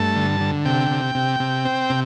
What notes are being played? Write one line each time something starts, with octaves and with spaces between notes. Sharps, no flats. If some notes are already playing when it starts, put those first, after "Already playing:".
Already playing: G2 A3 A5
D3
D3
C3 G5
C3
C3
C3
C4
C3